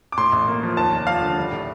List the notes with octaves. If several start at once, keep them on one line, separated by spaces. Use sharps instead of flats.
D6
A2 C6
A1
A#3
F3
D#2 A5
F1
F3 F5
D3
G3
A2